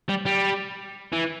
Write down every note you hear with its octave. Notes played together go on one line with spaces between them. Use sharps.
G3
G3
E3